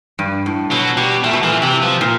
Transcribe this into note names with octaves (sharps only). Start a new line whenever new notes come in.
G2
A2
B2 F#3
B2 G3
A#2 A3
B2
A#2 E3
C3 E3
F3
A#2